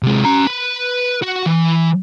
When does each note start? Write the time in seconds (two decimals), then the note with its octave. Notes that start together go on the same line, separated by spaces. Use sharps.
0.03 C3 G#3
0.25 C#4 A#5
0.47 B4
1.23 F#4
1.46 E3